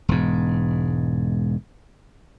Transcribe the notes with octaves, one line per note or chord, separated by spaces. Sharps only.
E1 G#2